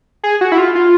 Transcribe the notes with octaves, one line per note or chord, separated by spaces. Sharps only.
G#4
F#4
E4
F4
F4